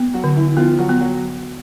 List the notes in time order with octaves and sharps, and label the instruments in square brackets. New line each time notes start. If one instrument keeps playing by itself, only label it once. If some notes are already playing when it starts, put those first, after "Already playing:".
Already playing: [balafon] B3
[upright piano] F#3 F#4
[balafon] D3
[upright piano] E3 E4
[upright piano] F3 F4 [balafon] B3
[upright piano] F#3 F#4
[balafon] B3
[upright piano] F#3 F#4